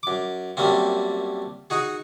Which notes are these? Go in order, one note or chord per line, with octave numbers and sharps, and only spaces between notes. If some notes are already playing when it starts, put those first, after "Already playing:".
F#2 D6
F#2 G3 A3 A#3 C4
D#4 F#4 G#4